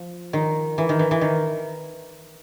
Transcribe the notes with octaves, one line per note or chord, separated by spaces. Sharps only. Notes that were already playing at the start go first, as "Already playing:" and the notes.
Already playing: F3
D#3
E3
D#3
E3
E3
D#3